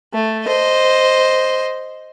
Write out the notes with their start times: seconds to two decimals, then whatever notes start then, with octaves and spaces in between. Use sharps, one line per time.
0.14 A3
0.45 C5 D#5